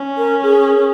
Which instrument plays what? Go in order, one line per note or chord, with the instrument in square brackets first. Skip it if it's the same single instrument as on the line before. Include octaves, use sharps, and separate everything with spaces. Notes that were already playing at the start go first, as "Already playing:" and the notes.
Already playing: [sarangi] C#4
[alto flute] A#4
G#4